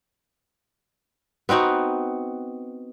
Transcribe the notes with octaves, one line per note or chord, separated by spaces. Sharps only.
B3 C4 D#4 F#4